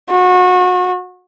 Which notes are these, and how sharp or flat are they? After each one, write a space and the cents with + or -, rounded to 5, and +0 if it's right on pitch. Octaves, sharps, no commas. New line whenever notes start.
F#4 -30